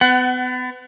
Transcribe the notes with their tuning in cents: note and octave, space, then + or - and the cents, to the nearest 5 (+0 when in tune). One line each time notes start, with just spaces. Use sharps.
B3 +35 F#5 +20